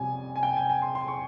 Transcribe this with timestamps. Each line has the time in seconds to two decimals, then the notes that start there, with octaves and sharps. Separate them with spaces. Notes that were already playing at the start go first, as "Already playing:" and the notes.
Already playing: F2 C3 G3 C#4 G#5
0.36 G#5
0.43 G5
0.56 G#5
0.70 G#5
0.82 C6
0.95 C6
1.08 C#6